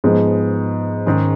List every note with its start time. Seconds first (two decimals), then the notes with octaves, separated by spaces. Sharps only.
0.04 G#2 F3 G#3 B3
1.06 G#2 D#3 G#3 C#4